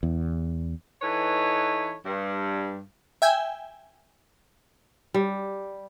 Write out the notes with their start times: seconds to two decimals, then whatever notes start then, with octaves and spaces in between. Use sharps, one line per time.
0.03 E2
1.01 E3 D#4 A4 B4 C#5
2.06 G2
3.22 E5 G5 G#5
5.14 G3